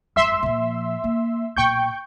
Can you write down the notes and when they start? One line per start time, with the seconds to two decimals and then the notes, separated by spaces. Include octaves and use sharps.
0.16 G#1 F#2 E5 C6 E6
0.43 A#2 F3
1.04 A#3
1.56 B1 A#2 G5 C#6 G6